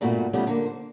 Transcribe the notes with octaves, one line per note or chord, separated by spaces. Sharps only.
G2 A#2 A3 B3 F#4
C#3 F3 G3 A3 B3 C#4
D3 A#3
C5